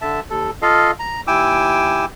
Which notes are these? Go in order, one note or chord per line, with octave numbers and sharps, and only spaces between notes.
D3 E5 A5
D#2 A4
F4 A4 D#5 F5
A#5
D#2 E4 G5 G#5 D6 E6